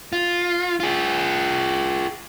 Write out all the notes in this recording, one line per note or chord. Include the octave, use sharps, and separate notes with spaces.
F4
F4 G#4